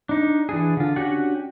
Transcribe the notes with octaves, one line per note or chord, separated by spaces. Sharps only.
D4 D#4
E3 D4 G#4
D3 F4
C#4 D4 F#4 G4 F#5